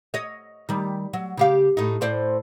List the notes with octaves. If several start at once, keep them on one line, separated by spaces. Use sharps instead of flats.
C#5 D#5
D#3 G3
F#3
C#3 G4 F5
A2 D#4
A2 C5 D5